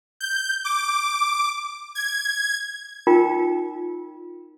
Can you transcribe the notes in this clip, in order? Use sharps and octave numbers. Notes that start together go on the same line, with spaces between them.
G6
D6
G#6
D#4 F4 A#4 D5 G5